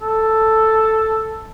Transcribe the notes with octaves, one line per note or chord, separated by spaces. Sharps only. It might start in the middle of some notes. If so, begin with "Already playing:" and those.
A4